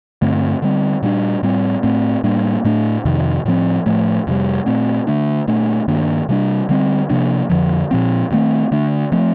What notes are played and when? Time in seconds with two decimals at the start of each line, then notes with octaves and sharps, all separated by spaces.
0.22 G2 D3 A3 C4
0.62 D3 G3 C4
1.02 A#2 G3 A#3 D4
1.43 A2 G3 C4
1.83 A2 A3 C4
2.24 A2 G3 A#3 D4
2.65 A2 A3 D4
3.05 F2 C3 D#3
3.45 A2 F3 C4
3.86 A2 F3 A3
4.27 F2 C3 G3
4.66 A#2 A3 C4
5.07 D3 A3 D4
5.48 A#2 A3 D4
5.88 G2 D#3 A#3 D4
6.29 C3 G3 D4
6.69 D3 G3 C4
7.10 C3 F3 A#3 D4
7.50 F2 D3 F3
7.91 A#2 F3 C4
8.31 G2 D#3 A3 C4
8.71 D3 A3 D4
9.12 F3 A3 C4